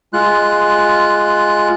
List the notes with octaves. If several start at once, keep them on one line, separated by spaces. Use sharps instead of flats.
G#3 F4 F#6